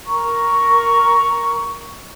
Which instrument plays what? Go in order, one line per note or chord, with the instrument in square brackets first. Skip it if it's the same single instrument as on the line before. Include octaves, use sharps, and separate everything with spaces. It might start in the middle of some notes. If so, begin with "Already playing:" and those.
[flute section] A#4 A#5 C#6